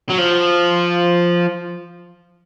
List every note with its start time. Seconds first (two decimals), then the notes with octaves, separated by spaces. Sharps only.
0.09 F#3
0.18 F3